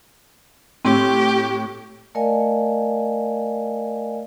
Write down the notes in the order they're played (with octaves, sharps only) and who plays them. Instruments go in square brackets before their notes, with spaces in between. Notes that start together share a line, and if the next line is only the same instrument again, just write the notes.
[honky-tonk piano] A2 E6 [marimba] C4 [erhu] G4
[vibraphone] A3 A#4 D5 D#5 F5 G#5